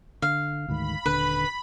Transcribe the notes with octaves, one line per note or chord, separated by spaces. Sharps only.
D3 F5
D2 G#2 D#3 B5
D#1 D3 B4